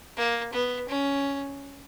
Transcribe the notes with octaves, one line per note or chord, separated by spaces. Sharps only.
A#3
B3
C#4